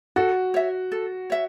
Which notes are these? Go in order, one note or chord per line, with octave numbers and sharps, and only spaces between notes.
F#4 A4
C#5 E5
A4
C#5 E5